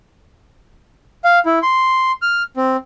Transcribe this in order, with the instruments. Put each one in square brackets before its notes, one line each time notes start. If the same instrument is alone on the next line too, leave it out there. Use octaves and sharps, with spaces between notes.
[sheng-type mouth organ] F5
E4
C6
F6
C4